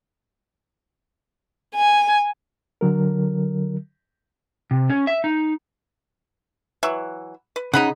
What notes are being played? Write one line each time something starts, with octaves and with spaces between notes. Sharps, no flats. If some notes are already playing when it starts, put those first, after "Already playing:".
G#5
D3 F#3 A#4
C3
C#4
E5
D#4
E3 F#3 E5
B4
C#3 D#4 F#5 B5